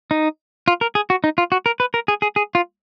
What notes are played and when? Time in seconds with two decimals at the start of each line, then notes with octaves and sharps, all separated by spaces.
0.11 D#4
0.68 F4
0.81 A#4
0.95 G#4
1.10 F#4
1.24 D#4
1.38 F4
1.52 F#4
1.66 A#4
1.80 B4
1.94 A#4
2.08 G#4
2.22 G#4
2.36 G#4
2.55 F4